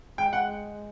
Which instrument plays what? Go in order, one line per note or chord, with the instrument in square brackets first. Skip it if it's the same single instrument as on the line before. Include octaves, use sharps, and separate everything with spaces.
[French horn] G#3 [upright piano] G5
[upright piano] F#5